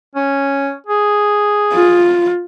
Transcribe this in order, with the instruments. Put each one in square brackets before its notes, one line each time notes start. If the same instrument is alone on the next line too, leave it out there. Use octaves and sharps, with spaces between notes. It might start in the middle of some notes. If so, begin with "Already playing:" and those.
[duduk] C#4
G#4
[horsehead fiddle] F4